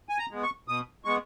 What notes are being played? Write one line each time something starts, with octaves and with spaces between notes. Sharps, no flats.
G#5
A#5
G#3 B3
C#6
B2 D#6
G#3 B3 C#6